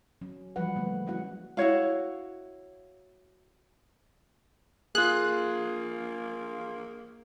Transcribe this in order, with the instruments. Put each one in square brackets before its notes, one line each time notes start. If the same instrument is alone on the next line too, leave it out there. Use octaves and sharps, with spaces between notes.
[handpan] F#3 C#4
E3 F3 G3 G#3 B4 F#5
D3 E3 G3 A3 A#3
G#3 C#4 E4 F#4 F#5
[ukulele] E4 F#4 C#5 F5
[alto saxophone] A#3 [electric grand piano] F4 G#4 [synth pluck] F#6